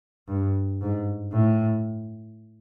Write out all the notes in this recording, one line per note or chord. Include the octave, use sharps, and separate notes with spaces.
G2
G#2
A2